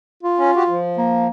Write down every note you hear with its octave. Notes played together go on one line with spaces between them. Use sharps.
F4
C#4
F#4 G4
F3
A#3